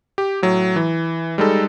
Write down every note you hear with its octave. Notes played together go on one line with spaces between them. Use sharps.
G4
A2 F#3
E3
G3 G#3 D#4 A4